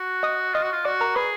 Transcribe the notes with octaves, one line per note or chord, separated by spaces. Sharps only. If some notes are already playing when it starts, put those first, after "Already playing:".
Already playing: F#4
D#5 D#6
F4 D#5 D#6
F#4
F4
F#4 D5 D6
A#4 A#5
G#4 B4 B5